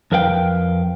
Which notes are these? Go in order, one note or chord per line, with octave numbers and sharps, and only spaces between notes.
F2 A#4 B4 F5 G5